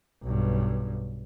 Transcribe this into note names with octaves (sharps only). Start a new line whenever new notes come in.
B1 G2